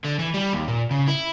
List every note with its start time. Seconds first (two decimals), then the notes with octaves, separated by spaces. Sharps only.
0.04 D3
0.19 E3
0.34 G3
0.53 D#2
0.68 A#2
0.91 C#3
1.08 E4